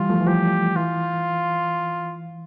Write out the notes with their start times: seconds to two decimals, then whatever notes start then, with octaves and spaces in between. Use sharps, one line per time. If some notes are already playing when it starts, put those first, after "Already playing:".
Already playing: E3 G3 F4
0.09 F3 A3
0.21 E3
0.27 F3 G4
0.76 E3 F4